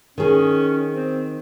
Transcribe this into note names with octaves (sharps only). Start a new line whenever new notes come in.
D#3 C#4 G#4
C4